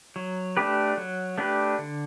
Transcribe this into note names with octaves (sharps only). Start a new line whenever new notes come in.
F#3
A3 D4 G4 B4
F#3
A3 D4 G4 B4
D3